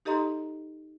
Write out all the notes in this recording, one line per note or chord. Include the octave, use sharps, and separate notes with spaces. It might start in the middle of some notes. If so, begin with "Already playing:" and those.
D#4 G4 A4 D#5 A#5 C6